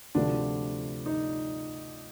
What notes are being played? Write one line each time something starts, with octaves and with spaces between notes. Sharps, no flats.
D2 C3 F3 A3 D4
D#4